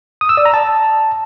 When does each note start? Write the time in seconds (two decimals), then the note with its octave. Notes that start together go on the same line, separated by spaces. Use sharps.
0.21 D#6
0.29 E6
0.37 D5
0.45 A#5
0.54 A5